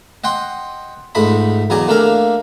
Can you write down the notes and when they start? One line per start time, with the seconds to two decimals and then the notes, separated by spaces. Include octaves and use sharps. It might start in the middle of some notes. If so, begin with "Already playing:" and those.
0.24 D#5 F#5 G5 C6
1.15 C#2 G#2 A3 D#5 B5
1.70 E2 C#3 F#3 D5 D#5 G#5
1.88 A3 A#3 D4 A4 F5 A#5